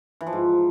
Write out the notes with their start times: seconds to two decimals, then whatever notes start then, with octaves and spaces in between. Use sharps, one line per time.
0.21 E3
0.27 F3
0.33 G#2